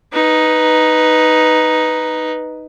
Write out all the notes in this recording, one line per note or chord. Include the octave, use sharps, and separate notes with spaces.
D#4 B4